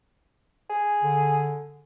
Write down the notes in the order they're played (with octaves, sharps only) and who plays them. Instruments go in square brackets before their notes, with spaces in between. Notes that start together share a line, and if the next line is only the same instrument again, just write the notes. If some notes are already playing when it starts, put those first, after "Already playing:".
[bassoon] G#4
[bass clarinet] D3